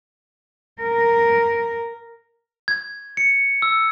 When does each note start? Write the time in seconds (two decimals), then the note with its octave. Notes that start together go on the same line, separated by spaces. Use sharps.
0.82 A#4
2.68 G#6
3.17 C#7
3.62 E6